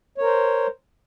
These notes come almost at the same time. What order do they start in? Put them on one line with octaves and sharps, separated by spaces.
C#5 A#4 C5